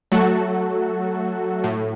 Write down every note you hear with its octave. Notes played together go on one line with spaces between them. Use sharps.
F#3 A3 F#4 A4
A2